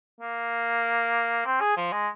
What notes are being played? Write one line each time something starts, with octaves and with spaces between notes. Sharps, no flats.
A#3
C4
G#4
F3
G#3